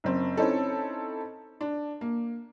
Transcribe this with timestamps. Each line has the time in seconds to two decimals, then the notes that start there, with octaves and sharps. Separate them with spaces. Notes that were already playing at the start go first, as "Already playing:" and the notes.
0.04 F#1 C4
0.37 C4 C#4 D#4 E4 A4
1.61 D4
2.01 A#3